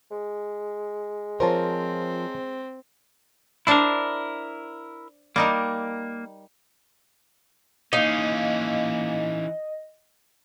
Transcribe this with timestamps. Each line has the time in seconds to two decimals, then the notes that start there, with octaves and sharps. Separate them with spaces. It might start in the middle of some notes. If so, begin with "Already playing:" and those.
0.11 G#3
1.40 F3 C4 F4 A#4 C5 C#5 A5
3.67 D4 E4 A#4 C5
5.36 G3 A#3 D#4 A#4
7.93 E3 A#3 C#4 D#4 D#5 F5